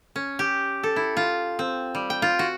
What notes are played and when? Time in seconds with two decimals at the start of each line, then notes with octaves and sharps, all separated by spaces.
0.16 C#4
0.39 G4
0.83 A4
0.96 E4
1.17 F4
1.59 C4
1.95 G3
2.10 G5
2.22 F4
2.39 F#4